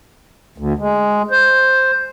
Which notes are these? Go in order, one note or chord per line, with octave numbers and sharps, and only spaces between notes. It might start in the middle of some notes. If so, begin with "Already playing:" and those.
D2
G#3
C5